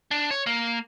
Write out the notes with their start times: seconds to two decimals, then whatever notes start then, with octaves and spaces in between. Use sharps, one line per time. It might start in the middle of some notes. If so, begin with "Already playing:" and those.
0.11 D4
0.31 C#5
0.47 A#3